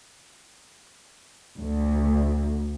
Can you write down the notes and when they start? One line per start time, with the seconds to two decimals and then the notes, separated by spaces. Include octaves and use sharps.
1.60 D2